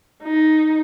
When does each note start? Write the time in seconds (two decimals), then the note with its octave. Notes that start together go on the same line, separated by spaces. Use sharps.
0.23 D#4